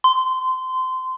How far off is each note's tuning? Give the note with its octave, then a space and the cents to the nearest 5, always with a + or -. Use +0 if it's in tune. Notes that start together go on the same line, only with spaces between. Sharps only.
C6 -20